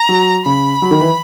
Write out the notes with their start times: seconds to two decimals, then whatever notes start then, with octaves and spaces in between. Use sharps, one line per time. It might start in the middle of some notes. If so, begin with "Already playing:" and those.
Already playing: A#5
0.09 F#3
0.46 C#3 B5
0.82 F#3
0.91 D#3
1.01 E3